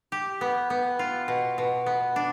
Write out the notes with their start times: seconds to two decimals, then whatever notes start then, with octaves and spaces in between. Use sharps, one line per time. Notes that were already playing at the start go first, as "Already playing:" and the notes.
0.12 G4
0.41 B3
0.70 B3
0.99 F4
1.28 B2
1.58 B2
1.86 B3
2.16 D4